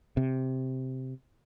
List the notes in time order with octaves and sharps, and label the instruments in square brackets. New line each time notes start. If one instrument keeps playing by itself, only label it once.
[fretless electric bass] C3